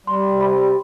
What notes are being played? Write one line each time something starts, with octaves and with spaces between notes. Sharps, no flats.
G3 C6
C3
B5
G3